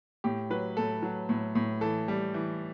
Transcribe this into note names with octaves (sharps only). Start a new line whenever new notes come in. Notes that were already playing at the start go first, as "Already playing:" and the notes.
A2 G4
F#3 B4
A2 A4
F#3
A2
A2
E3 A4
G3
E3